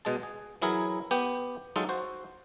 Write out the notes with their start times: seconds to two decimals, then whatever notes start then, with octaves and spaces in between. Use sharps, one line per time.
0.05 B2 G#3 G#4 A5
0.23 G#4
0.62 E3 F#3 E4 G#4 A#4
1.11 B3 G4 G5
1.76 F#3 G#3 D#4 F4 A4
1.89 F#4 C5